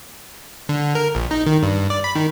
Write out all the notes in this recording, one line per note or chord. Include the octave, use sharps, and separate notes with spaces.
D3
A#4
A#1
D#4
D#3
G2
D5
B5
D#3